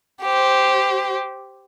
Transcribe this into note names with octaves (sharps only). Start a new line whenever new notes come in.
G4 C5